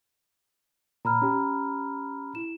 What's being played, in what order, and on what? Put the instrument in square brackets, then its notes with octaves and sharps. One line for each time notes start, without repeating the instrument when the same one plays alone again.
[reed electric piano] A#2 [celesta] A#5 B5 F6
[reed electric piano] C#4 G4
[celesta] E4 E7